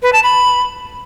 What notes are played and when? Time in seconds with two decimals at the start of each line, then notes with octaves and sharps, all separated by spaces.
0.03 B4
0.13 A5
0.23 B5